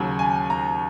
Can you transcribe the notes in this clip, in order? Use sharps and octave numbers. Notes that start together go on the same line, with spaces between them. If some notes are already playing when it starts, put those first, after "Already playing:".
Already playing: D#2 C#3 F#3
G#5
A#5